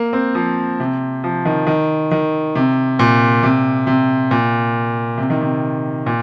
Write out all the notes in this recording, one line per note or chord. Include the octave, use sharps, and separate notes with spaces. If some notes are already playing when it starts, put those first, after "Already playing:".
Already playing: A#3
C4
F3
C3
F3
D#3
D#3
D#3
C3
A#2
C3
C3
A#2
C3
D#3
C3
A#2